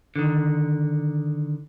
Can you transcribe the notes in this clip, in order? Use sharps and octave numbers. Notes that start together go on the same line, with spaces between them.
D3 D#3